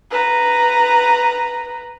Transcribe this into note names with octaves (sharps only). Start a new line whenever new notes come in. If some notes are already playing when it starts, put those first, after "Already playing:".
B4 A#5